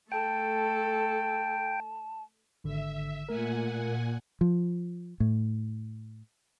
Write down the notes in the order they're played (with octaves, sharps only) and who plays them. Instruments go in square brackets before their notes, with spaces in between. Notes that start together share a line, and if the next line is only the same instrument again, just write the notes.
[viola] A3 A4 [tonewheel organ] G5 [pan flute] A5
[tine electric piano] G#1 D3 [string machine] E5
[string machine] A#2 F#5 G#5 [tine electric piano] A3 A#4
[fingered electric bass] F3
A2